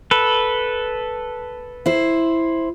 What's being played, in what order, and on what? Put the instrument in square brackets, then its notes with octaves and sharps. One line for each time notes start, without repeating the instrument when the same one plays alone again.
[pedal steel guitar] A4 B4
[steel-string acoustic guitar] E4 C5